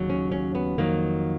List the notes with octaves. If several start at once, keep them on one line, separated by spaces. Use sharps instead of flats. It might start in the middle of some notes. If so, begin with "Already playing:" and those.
Already playing: D#2 C#3 F#3
C#4
C#4
B3
F2 D#3 F#3 A#3